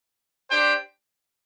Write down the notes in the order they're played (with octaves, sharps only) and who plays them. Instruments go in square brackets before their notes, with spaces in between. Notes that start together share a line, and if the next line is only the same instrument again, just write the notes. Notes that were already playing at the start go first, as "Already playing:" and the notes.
[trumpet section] D4 G4 C5 G5